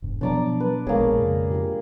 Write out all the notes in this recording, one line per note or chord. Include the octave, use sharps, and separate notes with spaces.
E1 G#2
B2 F3 F#3 D4 D5 A#5
B4
A#1 A#2 G#3 A#3 B3 G#4 C#5
F2 A2 C#3
F4 G4